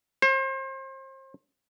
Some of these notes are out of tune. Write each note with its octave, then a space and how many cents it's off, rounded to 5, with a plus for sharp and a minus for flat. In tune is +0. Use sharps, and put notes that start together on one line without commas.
C5 +35